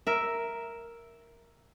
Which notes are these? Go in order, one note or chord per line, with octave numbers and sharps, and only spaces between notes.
A#4 E5